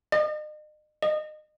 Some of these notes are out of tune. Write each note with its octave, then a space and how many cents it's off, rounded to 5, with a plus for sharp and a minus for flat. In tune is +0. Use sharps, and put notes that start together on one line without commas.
D#5 -40
D#5 -25